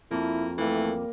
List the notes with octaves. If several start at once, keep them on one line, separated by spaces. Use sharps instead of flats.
F2 A#3 E4
E3 G3 A3 A#3